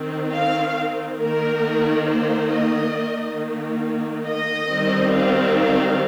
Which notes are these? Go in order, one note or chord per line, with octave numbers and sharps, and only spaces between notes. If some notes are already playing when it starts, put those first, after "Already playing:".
Already playing: D#3 C4
F5
D#3 A#3 A#4
C5
D#5
D#3 A#3
D#5
D#3 G3 C4
F5
F5